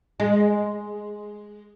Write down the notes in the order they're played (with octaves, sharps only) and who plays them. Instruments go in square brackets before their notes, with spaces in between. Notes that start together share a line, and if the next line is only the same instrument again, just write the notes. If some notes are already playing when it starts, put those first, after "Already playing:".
[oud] G#3